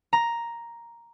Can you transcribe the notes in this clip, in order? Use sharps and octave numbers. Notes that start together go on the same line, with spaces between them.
A#5